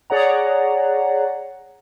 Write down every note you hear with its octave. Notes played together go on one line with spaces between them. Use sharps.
G#4 C#5 D5 F#5 A#5